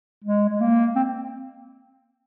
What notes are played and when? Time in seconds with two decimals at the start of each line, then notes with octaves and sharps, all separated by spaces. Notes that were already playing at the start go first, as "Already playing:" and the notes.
0.24 G#3
0.49 G#3
0.61 A#3
0.95 C4